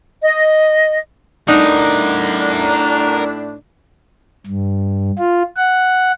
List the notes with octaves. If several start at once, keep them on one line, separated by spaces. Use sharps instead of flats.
D#5
A2 D4 D#4 A#4 F#5
G2
F4
F#5